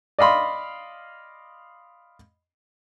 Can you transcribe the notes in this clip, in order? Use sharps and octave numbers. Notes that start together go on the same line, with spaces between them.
D5 D#5 F5 B5 C6